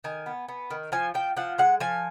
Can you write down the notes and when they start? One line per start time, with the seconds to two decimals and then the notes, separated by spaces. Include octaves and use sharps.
0.04 D#3 G#5
0.26 B3
0.48 B3
0.70 D#3
0.92 F3 G#5
1.14 F3 G5
1.37 F3 F#5
1.58 G#3 F#5
1.80 F3 G#5